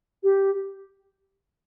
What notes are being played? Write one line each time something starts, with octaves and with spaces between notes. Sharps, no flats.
G4